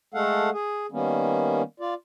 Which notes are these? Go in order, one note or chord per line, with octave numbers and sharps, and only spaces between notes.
G#3 A3 A4 F5 F#5
G#4
D#3 G3 A#3 B3 C#4
F4 D5